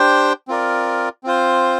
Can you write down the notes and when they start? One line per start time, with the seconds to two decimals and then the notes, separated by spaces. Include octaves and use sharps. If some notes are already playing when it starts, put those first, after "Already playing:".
Already playing: D4 G4 C5 G5
0.48 C4 F4 A#4 D5
1.24 C4 F4 C5